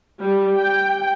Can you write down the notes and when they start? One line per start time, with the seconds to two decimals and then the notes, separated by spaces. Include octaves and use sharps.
0.22 G3
0.58 G5